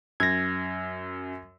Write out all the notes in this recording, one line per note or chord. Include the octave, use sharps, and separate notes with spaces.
F#2 G#6 A#6